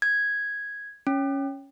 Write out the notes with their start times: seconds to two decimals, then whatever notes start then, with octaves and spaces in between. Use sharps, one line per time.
0.02 G#6
1.07 C#4